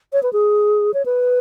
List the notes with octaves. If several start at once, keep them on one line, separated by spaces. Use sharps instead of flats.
C#5
B4
G#4
C#5
B4